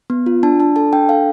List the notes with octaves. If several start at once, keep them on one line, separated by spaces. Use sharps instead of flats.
B3
F4
D4 A5
D4 A5
A4 A5
D4 G5
A4 F5